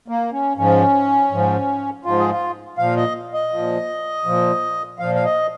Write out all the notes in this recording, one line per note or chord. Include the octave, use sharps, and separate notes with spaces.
A#3
C#4
G#2 F3 C#4
G#2 F3
G#2 F3 F4
G#4
F4
A#2 F3 F5
D#5
D#5
A#2 F3
A#2 F3
A#2 F3 F5
F5
D#5